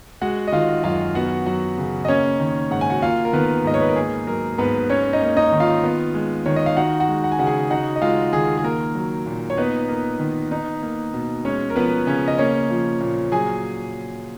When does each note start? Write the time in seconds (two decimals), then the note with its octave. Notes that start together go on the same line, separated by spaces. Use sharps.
0.21 G#3 F#4 F#5
0.47 D#5
0.52 D#3 F4 F5
0.84 F#2 F4 F5
1.15 B3 F#4 F#5
1.46 F#3 F#4 F#5
1.78 C#3
2.05 D#5
2.08 A#3 C#4 C#5
2.40 D#3
2.71 G#2 F#5
2.81 G#5
2.90 F#4 F#5
3.02 A#3 F4 F5
3.25 A#4
3.33 D#3 B3 B4
3.64 G#2 D#5
3.74 C#5
3.81 B4
3.88 A#4
3.96 A#3 G#4
4.27 F#3 A#4
4.58 G#2 B3 B4
4.90 C#4 C#5
5.13 D#4 D#5
5.21 A#3
5.37 D#4 D#5
5.52 D#3
5.60 F4 F5
5.83 B3
6.14 G#3
6.46 D#3 C#5
6.56 D#5
6.66 F5
6.77 D#4 F#4 F#5
7.00 F#4 F#5
7.08 G#3
7.24 F#5
7.32 G#5
7.39 C#3 F#4 F#5
7.47 G#4 G#5
7.70 D#4 F#4 F#5
7.96 D#5
8.02 G#3 F4 F5
8.33 D#3 G#4
8.58 G#4
8.64 A#3 A#4
8.95 F#3
9.26 A#2
9.50 C#5
9.57 B3 D#4 B4
9.89 A#3
10.20 D#3
10.51 D#4
10.82 A#3
11.14 B2
11.45 G#3 C#4 C#5
11.70 A#4
11.76 F3 B3 B4
12.07 C#3 C#4 C#5
12.28 D#5
12.38 A#3 C#4 C#5
12.70 F3
13.01 A#2
13.32 F#3 G#4 G#5